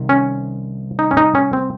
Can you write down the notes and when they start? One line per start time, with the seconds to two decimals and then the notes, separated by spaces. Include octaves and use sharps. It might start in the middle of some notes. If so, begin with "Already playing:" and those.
Already playing: C2 C3 D#3
0.09 C#4
0.99 D#4
1.11 C#4
1.17 D#4
1.35 C#4
1.53 C4